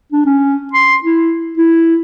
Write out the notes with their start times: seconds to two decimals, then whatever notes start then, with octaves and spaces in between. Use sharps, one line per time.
0.12 D4
0.26 C#4
0.73 C6
1.04 E4
1.58 E4